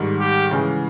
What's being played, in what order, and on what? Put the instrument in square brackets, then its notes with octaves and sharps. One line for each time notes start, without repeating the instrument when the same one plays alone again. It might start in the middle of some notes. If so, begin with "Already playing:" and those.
Already playing: [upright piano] G#2 D#3 G3
[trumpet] G4
[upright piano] C#3 E3 G#3